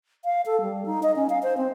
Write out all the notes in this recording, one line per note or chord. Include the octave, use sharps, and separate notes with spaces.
F5
A4
G3
D#4
D#5
C#4
F5
C5
C4